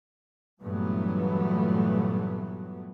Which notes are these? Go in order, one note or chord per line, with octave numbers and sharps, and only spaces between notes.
G2 A#2 E3 F#3 A3 B3